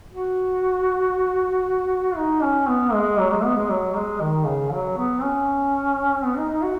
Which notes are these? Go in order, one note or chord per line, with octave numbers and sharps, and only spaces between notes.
F#4
D#4
C#4
B3
G#3
F#3
G#3
B3
G#3
F#3
G#3
D#3
C#3
F#3
B3
C#4
B3
D#4
D#4
F#4